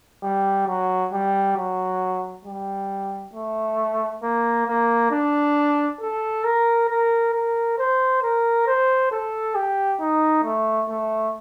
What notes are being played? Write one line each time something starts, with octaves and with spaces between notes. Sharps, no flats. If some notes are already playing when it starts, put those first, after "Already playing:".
G3
F#3
G3
F#3
G3
A3
A#3
A#3
D4
A4
A#4
A#4
A#4
C5
A#4
C5
A4
G4
D#4
A3
A3